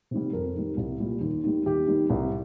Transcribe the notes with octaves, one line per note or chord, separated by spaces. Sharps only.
C3 D#3 G3
F2 A#4
D#3 G3
C2
A#2 G3
D#2
D#3 G3
D#2 G4
D#3 G3
C2